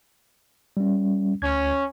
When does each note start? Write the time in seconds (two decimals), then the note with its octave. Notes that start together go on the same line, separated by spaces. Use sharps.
0.77 G3 C#4
1.42 D2 C#4 G#6